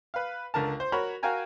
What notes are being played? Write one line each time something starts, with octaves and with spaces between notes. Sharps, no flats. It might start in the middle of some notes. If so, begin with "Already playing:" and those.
B4 F5
C#2 D3 A#4 A5
C5
F#4 A#4 C#5 B5
F#4 A#4 F5 G5 G#5 A#5